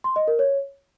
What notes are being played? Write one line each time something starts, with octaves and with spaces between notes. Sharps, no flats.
C6
D#5
A#4
C#5